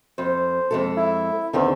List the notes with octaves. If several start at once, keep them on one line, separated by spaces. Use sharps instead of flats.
F2 C5
F2 G#3 A4
E4
E2 D3 D#3 C4